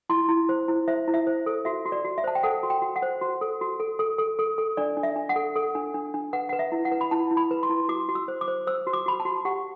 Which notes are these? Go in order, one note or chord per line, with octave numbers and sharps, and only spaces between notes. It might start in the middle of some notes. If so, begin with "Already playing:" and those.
E4 C6
E4
C5
E4
C5 E5
E4
E5
C5
A4
F#4 E5
F#4
D5
F#4
E5
C5 A5
G5
A4 F#5
F#4
G5
F#4
F#5
C5
F#4
A4
F#4
A4
A4
A4
A4
A4
D4 D5
D4
E5
D4
F#5
A4
A4
D4
D4
D4
B4 F#5
B4 F#5
E5
E4
F#5
B4
B5
E4 A5
E4
B5
B4
C6
E4
F#4 D6
F#4
E6
C5
D6
C5
C5 E6
F#4
D6
F#4 B5
A5
F#4
G4 F#5